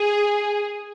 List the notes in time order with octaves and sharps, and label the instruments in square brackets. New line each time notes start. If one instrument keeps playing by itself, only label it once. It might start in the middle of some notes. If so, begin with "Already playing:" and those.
Already playing: [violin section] G#4